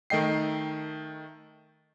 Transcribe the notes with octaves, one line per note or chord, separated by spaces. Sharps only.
D#3 A3 D#5 G5 C7